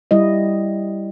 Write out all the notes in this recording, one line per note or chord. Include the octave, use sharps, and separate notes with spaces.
G3 E4 D#5